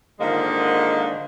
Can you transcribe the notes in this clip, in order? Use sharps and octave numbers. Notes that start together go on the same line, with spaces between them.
G#2 D3 D#3 F3 G#3 A#3